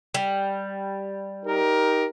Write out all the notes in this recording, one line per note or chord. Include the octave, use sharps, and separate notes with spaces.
G3
D#4 G4 A#4